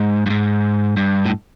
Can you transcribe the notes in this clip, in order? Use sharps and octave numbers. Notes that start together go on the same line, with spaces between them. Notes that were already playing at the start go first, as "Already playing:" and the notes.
Already playing: G#2
G2
G#2
G2
A2